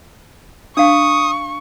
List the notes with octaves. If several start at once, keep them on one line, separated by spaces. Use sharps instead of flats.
D4 F5 C#6 D#6